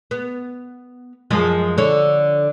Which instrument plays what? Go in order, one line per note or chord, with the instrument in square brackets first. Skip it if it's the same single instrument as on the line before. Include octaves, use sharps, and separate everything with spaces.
[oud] B3
F#2 F3 G#3
D3 C#5